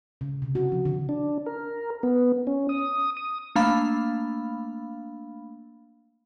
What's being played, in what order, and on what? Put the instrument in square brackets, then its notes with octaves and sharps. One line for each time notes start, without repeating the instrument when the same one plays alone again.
[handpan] C#3
C3
F#4
F3
D3
[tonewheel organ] D4
A#4
B3
C#4
D#6
D#6
[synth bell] A3 A#3 D4 F5 B5